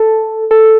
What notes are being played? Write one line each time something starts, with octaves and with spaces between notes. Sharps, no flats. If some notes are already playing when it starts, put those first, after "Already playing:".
Already playing: A4
A4